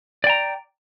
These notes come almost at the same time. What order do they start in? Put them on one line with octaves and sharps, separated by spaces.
D5 G5 A#5